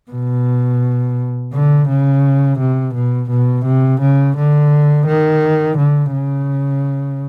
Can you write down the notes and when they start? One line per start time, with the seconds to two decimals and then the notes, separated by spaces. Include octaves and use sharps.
0.11 B2
1.53 D3
1.88 C#3
2.59 C3
2.94 B2
3.30 B2
3.66 C3
4.01 C#3
4.37 D3
5.07 D#3
5.78 D3
6.13 C#3